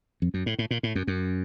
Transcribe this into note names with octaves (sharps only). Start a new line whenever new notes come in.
F2
F#2
A2
A2
A#2
A2
F#2
F#2